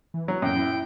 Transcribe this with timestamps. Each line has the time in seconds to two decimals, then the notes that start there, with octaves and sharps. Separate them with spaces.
0.14 E3
0.28 F#3
0.42 F#2 A#2 G5
0.56 E4